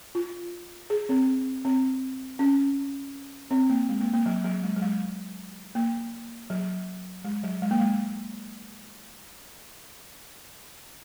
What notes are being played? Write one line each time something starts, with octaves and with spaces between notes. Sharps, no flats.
F4
G#4
C4
C4
C#4
C4
A#3
G#3
A#3
A#3
F#3
F#3
G#3
F#3
G#3
A#3
F#3
G#3
F#3
G#3
A#3
G#3